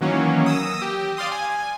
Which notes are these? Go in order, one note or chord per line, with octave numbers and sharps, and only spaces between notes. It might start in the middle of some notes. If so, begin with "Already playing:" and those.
D#3 E3 F#3 A#3 C#4
D#6 E6 A#6
G4
D5 F5 C6 D#6
G#5